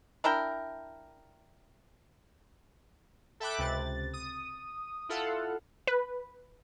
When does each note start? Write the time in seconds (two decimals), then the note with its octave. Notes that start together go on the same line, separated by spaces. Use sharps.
0.24 D4 E4 A#4 G5
3.40 A4 E5 G5 B5 D6 F#6
3.58 C#2 C3 A6
4.13 D#6
5.09 E4 F4 A4 F5 F#5
5.87 B4